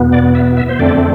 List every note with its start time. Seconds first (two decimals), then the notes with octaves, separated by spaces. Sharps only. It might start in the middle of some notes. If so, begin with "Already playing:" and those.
Already playing: E2 B2 B3
0.13 D5
0.35 E5
0.57 E5
0.69 C5
0.79 F2 D3 A3 C4 D5